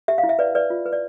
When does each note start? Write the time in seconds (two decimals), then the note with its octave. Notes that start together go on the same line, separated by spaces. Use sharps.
0.08 G4 E5
0.18 F5
0.23 E4
0.29 E5
0.39 B4 D5
0.55 B4 D5
0.70 F4
0.86 B4
0.93 D5